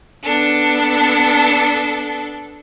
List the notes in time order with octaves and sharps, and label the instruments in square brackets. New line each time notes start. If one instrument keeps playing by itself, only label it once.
[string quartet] B3 D4 A4